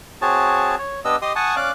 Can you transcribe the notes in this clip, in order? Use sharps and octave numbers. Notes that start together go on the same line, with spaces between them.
C4 F#4 G#4 C#5 A5
C#5
B3 D4 G4 D#5 E6
G4 D#5 C6 D#6
F#5 G#5 A5 C#6 D#6
C#4 D5 F5 D6 F#6